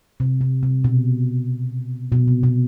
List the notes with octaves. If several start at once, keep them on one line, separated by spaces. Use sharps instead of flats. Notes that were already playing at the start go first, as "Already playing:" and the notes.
C3
C3
C3
B2
B2
C3
B2